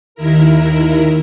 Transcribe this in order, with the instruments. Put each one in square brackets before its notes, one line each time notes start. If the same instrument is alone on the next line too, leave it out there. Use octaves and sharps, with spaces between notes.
[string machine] D#2 D#3 E4 A#4